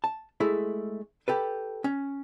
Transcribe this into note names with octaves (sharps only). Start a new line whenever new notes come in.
A5
G#3 A3 E4
G4 A4 B4
C#4